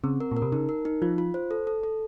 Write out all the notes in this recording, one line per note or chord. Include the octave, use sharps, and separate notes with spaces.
C#3 C4
A#4
A#2
A#4
C3
C#3 D#4
A#4
D#4
F3 F4
F4
C5
A4
A4
A4